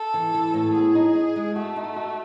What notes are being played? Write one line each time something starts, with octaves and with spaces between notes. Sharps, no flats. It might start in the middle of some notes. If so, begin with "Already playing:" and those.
Already playing: A4
E3
E3
A2
B3 G#4
D#4
D#4
G#3
A3 F#4
D#4
F#4